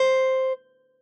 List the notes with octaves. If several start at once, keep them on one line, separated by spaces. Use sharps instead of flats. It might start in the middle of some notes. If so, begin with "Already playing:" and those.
Already playing: C5